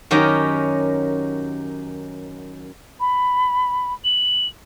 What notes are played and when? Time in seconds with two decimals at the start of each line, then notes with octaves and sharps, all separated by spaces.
0.11 F#2 D#3 C#4 G4 A#4 D#5
3.00 B5
4.05 F#7